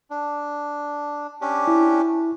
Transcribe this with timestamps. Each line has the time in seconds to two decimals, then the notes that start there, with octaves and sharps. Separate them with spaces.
0.10 D4
1.41 C#4 D4 G4
1.68 E4